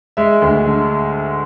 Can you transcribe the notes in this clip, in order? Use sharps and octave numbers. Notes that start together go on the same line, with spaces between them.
G#3 E5
D2
D3